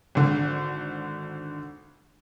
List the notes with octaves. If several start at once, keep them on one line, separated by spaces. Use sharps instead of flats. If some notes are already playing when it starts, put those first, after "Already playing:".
G#1 D3